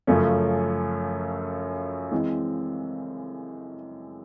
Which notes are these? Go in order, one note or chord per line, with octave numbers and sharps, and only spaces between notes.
F#2 C#3 F3 A3 C#4
E3 G#3 C4